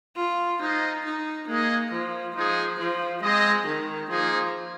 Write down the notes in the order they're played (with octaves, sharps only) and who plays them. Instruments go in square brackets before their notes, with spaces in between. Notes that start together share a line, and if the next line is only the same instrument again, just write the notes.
[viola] F4
[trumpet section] G#3 F4 C5 D#5 [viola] D#4
[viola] D#4
[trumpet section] G#3 D#4 G#4 D#5 [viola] A#3
[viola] F3
[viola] F3 [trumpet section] G#3 D#4 G#4
[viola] F3
[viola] G#3 [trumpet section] C4 G#4 D#5
[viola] D#3
[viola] F3 [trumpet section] A#3 D#4 G#4